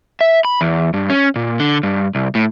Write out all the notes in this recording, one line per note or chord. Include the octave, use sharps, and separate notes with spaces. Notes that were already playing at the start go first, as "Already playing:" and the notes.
E5
B5
E2
G2
C#4
A#2
D3
G2
C2
A2